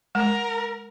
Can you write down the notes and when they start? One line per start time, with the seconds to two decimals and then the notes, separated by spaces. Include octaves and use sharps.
0.15 G#3 A#4